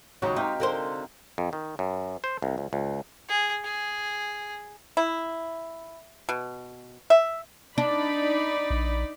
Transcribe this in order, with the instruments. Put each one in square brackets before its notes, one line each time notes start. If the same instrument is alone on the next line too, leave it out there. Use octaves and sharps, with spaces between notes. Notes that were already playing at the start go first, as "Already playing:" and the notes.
[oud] D#2 C#3 F#3 [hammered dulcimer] G#3 D#4 F#4
[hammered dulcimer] C3 G4 F5 [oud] D#4
[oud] D3 A#4 C5
[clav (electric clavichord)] F2
D#3
F#2
C5
C2
C#2
C#2
[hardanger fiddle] G#4
G#4
[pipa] E4
B2
E5
[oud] D4 [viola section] D#4 D5 B5
[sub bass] A#1